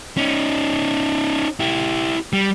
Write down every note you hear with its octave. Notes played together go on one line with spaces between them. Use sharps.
C#4 D#4
E4 G4
G3